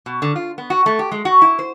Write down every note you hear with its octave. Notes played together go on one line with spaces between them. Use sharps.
B2
D3
F4
B3
F#4
A3
G4
G#3
F#4
E4
C5